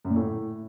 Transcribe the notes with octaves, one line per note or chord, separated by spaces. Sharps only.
F#2
A#2
A2